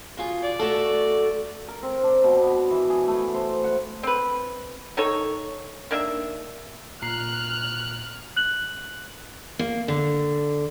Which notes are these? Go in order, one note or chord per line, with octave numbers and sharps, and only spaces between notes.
B2 F4 G#4
D5
A3 F#4 A4
A#4
C4
D4
B2
B3
E3
G#4
A3
C5
F#5
C4 B4
D#3 D#4 A4 C#5
D#3 A#3 D4 E5
A#2 A#5 F6 F#6 C7
F#6 F#7
A#3
D3